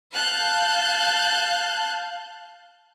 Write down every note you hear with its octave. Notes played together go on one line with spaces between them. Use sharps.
F5 A5 F#6 G6